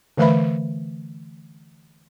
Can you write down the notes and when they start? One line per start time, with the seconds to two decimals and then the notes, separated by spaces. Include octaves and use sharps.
0.18 D3 E3 A3 B4 E5 B5